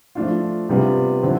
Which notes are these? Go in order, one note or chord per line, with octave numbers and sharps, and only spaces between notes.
F3 A3 D4 F4
C3 G3 B3 D4 F4
D3 F3 C4 E4